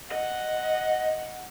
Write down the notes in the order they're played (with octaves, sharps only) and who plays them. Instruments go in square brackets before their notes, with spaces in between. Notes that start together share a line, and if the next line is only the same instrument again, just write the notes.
[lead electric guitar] D#5 [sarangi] F#5